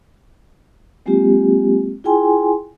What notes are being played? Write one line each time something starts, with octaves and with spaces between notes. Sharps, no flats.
F#3 G#3 A#3 C4 F4 G4
E4 F4 G#4 G5 G#5 C6